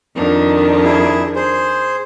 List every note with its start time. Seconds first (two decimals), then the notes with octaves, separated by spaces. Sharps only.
0.14 F2 D#3 D4
0.84 E4 G#4
1.35 G#4 C5